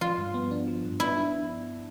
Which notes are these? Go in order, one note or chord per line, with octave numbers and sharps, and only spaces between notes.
F3 F4
G2
B3
D4
F3
G2
B3 E4
D4